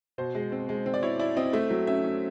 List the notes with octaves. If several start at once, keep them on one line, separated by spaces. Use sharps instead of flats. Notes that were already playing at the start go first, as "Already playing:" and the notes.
B2 C5
G#3
C4
G#3
C4
D5
E4 C#5
E4 D5
C4 D#5
A3 E5
F#3
C#4 E5
C#4